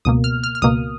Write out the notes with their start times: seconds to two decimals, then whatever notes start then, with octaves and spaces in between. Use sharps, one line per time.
0.05 C#2 B2 A#3 D#6
0.24 F6
0.44 F6
0.55 F6
0.62 C#2 B2 A#3 D#6